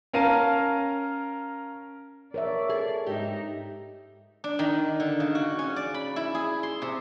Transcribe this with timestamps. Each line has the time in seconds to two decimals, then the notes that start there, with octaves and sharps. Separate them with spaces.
0.13 C#4 A#4 F5 A5 A#5 D#7
2.34 A#4 C#5 D5 E5
2.69 G#4 A4
3.06 G#2 D#4 G4 E5
4.44 D4
4.59 D#3
5.00 D3
5.20 C#3
5.35 F#4
5.59 C#4
5.76 D5
5.94 B5
6.16 E4
6.35 G#4
6.63 C6
6.82 C3